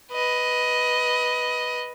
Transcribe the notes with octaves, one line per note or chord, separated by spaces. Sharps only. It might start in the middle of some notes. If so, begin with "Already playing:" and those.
B4 D#5